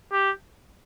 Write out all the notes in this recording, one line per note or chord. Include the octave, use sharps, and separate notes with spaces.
G4